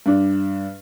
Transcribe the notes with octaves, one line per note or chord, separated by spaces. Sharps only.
G2 D4